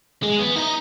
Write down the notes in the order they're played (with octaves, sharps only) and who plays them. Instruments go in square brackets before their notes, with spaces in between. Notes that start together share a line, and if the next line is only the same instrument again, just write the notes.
[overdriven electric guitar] G#3
B3
D#4